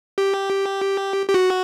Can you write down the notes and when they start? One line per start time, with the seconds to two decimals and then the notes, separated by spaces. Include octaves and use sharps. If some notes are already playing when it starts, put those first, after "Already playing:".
0.18 G4
1.29 G4
1.34 F#4